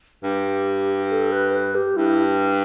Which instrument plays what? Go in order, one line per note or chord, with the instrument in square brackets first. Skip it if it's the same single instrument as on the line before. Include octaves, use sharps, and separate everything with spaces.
[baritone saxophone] G2 [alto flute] G4
[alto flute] A4
B4
B4
G4
[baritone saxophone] G2 [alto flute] E4